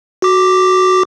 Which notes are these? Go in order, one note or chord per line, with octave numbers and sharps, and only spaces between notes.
F#4 D6